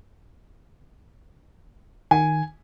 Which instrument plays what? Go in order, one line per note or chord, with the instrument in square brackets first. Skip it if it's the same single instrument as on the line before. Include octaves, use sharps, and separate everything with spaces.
[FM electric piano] D#3 [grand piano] G#5